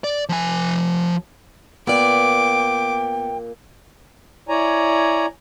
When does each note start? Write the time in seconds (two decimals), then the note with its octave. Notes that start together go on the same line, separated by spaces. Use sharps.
0.04 D5
0.29 F3 G#5
1.87 A#2 B3 D5 G5 D6
4.49 E4 C#5 D5 G#5 A#5